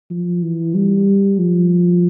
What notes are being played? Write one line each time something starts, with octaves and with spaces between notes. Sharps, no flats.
F3
E3
G3
F3